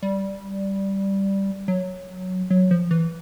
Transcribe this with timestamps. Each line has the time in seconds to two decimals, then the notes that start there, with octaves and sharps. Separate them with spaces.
0.02 G3
1.68 F#3
2.50 F#3
2.71 F3
2.91 E3